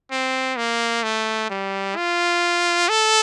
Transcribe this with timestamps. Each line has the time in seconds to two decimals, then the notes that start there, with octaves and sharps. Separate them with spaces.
0.11 C4
0.57 A#3
1.04 A3
1.50 G3
1.96 F4
2.89 A4